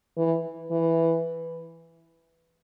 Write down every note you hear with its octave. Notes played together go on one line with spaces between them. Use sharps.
E3
E3